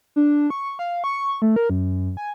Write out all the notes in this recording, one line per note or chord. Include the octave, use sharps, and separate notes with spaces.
D4
C#6
F5
C#6
A3
A#4
F#2
G#5